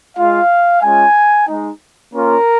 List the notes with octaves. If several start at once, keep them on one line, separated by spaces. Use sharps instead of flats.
G#3 F4 F5
G#3 C#4 F4 G#5
G#3 D#4
A#3 C#4 F4 A#4